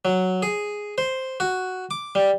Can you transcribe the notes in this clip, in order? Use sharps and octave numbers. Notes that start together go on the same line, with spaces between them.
F#3
G#4
C5
F#4
D6
G3